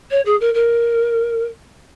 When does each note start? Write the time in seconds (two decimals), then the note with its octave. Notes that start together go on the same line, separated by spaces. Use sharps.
0.10 C#5
0.25 G#4
0.40 A#4
0.54 A#4